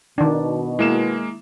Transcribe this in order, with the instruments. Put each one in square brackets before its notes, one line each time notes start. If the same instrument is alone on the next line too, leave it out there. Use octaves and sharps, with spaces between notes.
[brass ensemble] B2 [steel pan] D#3 D4
[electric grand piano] G#3 A#3 E7 [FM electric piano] E4